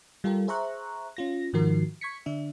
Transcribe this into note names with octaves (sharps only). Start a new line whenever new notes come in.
G3 F4 G4 A4 A#4
G#4 C5 E5 A#5 C#6 F#6
C#4 F4 A#6
G#2 D#3 F3 F#4 A#4 C7
C#6 G#6 B6 C#7
D3 D4 E5